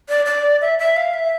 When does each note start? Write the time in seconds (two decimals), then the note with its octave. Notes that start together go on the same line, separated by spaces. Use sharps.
0.09 D5
0.26 D5
0.61 E5
0.79 E5
0.97 F5
1.14 E5